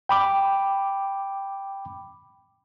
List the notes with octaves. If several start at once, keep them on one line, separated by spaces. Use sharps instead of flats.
G5 B5 D6